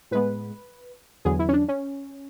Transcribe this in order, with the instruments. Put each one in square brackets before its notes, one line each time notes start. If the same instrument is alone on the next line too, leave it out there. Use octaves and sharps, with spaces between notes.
[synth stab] A2 G#3 B3 B4
E2 D3 F#3 B3 G#4
E4
C#4
D4
C#4